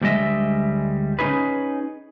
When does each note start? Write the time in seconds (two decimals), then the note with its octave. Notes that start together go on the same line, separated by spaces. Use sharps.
0.01 D2 G3 G#3 D#5 E5
1.19 C#4 D#4 G#4 B4